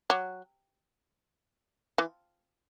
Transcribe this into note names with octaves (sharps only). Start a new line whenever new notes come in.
F#3
E3